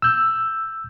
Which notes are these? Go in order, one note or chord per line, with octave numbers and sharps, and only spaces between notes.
E6 G6